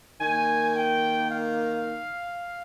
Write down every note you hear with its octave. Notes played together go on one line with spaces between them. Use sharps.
D#3 A#3 G#5
G5
F5